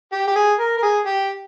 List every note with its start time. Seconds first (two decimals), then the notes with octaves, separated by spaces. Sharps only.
0.12 G4
0.27 G4
0.36 G#4
0.59 A#4
0.78 A#4
0.82 G#4
1.06 G4